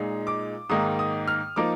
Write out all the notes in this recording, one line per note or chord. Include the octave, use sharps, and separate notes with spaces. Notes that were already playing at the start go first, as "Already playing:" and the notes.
Already playing: A#2 G#3 D#4
D6
G#2 D#3 A#3 D#4 D#6
D#6
F6
F3 A#3 D#4 D6